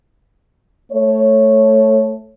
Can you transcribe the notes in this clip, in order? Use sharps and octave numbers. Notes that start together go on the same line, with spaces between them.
A3 C#5